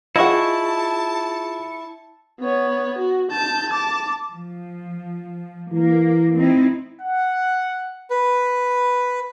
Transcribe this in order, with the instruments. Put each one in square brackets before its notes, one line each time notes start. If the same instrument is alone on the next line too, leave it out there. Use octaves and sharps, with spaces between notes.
[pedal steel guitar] E4 C#6 [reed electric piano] F4 G#4 [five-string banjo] D#5 F#5 [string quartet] A5
[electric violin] B3 C#5
F#4
A5 G6
A5 D6
[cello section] F3
[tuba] E3 [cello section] A#3
[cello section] C4 D#4 E4
[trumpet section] F#5
[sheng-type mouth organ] B4